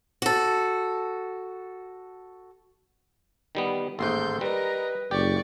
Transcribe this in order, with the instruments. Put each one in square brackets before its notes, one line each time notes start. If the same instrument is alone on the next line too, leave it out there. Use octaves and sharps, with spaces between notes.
[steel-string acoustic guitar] F#4 A4
[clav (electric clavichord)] D#3 G3 B3
[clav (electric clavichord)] A1 D#2 G#2 [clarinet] A4 [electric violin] C6 G6
[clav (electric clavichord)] G3 [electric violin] A#4 D#5 [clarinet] B4
[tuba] F#1 [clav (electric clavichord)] G4 [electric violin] D5 C#6